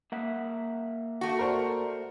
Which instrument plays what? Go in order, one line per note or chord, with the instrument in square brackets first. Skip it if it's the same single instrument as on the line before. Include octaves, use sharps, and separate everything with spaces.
[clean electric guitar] A#3 E5 F#5
[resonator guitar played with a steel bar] A3 F#4
[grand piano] A#4 C5 D5